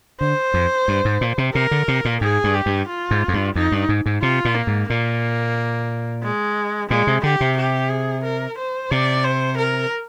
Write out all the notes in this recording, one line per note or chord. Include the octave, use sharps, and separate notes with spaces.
D3 C5
F2
G2
G#2
A#2
C3
C3 A#4
D3
C3
A#2
G#2 G#4
G2
G4
G2
F4
G#2
F2
G2
F2 D#4
G2
G#2
G#2
C3 F4
A#2
A#3
G#2
A#2 A#3
G#3
A#2 G#3
C3
D3 G4
C3
G4
G#4
A#4
C5
C3 D5
C5
A#4